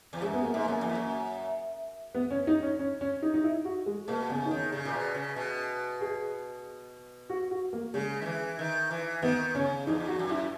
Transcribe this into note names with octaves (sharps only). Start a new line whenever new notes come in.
E2
F#2 G#3
B3
A#3
G#2
F#2 A#3
E2
F#2
B3
C#4
D#4
C#4
C#4
C#4
D#4
D#4
E4
F#4
G#3
B2 A#3
C#3 B3
D#4
D#3 C#4
C#3 G#4
A#2
B2
C#3
B2
G#4
F#4
F#4
A#3
C#3 G#3
D#3
E3
D#3
E3
D#3 B3
C#3 C#4
E2 D#4
F#4
F#2
E4